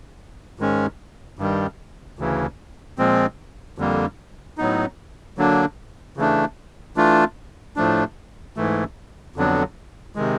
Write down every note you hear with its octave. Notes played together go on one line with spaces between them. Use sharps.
G#2 D#3 G#3 C#4
G2 D#3 G3
D2 C#3 E3
A#2 F3 G#3 C4
F2 D3 G3 A#3
A2 F#3 B3 D#4
D3 F#3 A#3 D4
C#3 E3 A3 D4
E3 A3 D4 F4
A2 F3 A3 D4
G#2 E3 A3
F2 D3 F#3 B3 D4
C3 D#3 G#3